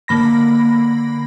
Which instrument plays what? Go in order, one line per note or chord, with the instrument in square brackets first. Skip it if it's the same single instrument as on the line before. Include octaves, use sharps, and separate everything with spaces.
[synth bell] D3 A#3 B5 A#6